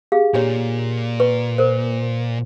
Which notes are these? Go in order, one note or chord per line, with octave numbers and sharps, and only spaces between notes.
G4 G#4 F5
A#2 D4 G4 C#5
B4 C#6
A#4 C5